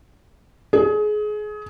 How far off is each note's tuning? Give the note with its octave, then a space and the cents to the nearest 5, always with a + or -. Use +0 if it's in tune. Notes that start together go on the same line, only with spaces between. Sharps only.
G#4 +25